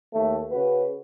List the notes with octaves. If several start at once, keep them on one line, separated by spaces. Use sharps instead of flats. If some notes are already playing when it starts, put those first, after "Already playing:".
D#2 A3
C#3 F#4 B4